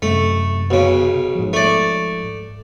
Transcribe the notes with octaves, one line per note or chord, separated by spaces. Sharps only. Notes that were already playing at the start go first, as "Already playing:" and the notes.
F#2 C3 A3
B1 C#3
G#2 F3
A3 D5